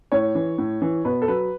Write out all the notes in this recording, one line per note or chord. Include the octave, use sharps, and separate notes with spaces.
A2 C#5
E3
A2
E3
B2 B4
A4
F#3 B4